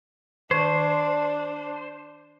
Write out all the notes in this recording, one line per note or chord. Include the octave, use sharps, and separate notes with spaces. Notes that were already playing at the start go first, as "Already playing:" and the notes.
D#3 D4 C5